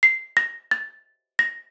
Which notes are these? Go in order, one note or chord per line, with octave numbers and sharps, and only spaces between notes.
C7
A#6
A6
A#6